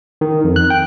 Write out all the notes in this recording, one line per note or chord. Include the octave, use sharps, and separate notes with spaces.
D#3
F2
F#6
G5